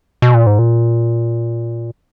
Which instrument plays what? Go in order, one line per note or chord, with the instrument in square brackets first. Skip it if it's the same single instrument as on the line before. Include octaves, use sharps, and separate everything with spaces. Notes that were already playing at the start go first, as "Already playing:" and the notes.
[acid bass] B2
A#2
G#2
A#2